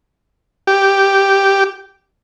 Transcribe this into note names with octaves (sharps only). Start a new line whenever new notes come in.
G4